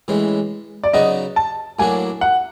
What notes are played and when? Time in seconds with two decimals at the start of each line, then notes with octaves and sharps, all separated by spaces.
0.08 A2 E3 G#3 C#4
0.84 D5
0.93 C#3 F#3 B3 D#4 F#4 D#5
1.36 A5
1.79 A2 F#3 A#3 D4 F#4 G#5
2.21 F#5